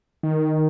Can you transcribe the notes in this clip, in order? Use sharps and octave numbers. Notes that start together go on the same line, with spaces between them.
D#3